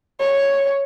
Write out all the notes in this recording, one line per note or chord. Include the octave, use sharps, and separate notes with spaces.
C#5